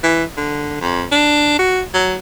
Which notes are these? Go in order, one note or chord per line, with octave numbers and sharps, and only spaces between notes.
E3
D3
F2
D4
F#4
F#3